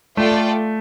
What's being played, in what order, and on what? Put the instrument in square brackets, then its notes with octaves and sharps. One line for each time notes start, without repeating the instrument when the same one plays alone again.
[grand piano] A3 [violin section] F4 A4 D5 G5